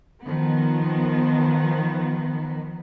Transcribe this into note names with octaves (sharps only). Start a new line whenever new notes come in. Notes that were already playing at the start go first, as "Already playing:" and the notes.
D#3 F3 B3